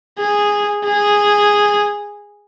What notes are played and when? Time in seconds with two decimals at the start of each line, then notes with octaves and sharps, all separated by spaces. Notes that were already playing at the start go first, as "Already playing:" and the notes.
0.19 G#4
0.85 G#4